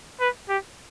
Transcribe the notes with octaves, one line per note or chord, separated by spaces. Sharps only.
B4
G4